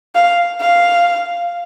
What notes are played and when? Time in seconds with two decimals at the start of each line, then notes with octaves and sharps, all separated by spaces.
0.15 F5
0.61 F5